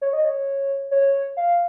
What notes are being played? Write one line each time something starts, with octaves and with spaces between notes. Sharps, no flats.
C#5
D#5
C#5
C#5
F5